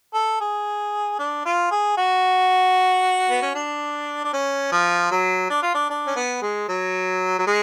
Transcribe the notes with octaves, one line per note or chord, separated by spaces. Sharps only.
A4
G#4
D4
F4
G#4
F#4
B3
C#4
D4
D4
C#4
F3
F#3
D4
F4
D4
D4
C#4
B3
G#3
F#3
F#3
G#3